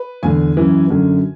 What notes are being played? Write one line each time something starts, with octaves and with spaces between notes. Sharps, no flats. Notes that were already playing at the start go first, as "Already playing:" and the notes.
Already playing: B4
E2 D3 G#5
F#2 E3
F#2 D3